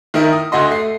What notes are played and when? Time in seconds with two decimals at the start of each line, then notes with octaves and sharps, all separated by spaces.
0.14 D#3 D#4 E4 A#4
0.33 D#6
0.52 D2 D3 F#4 D#5 C6
0.71 A3 C7